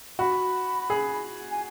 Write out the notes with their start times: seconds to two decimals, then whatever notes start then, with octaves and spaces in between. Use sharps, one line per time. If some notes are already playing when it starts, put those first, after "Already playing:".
0.19 F#4 B5
0.90 G#4
1.51 G#5